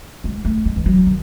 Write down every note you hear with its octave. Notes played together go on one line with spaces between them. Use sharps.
G#3
A3
G#3
E3
F#3
D#3